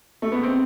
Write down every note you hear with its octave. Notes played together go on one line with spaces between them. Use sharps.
A3
B3
C4